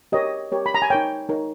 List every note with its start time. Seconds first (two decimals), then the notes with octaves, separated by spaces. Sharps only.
0.12 G4 A#4 C#5 D#5
0.52 G4 A#4 C#5
0.66 B5
0.75 A#5
0.82 G#5
0.90 D#4 A#4 C#5 G5
1.29 D#4 A#4 C#5